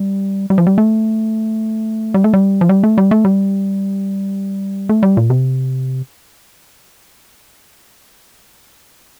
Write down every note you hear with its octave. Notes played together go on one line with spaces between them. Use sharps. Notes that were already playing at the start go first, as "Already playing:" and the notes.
Already playing: G3
G3
F3
G3
A3
G3
A3
G3
F3
G3
A3
G3
A3
G3
A3
G3
A#2
C3